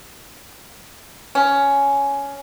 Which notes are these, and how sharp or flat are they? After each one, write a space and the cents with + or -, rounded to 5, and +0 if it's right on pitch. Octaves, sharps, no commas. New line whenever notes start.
C#4 +10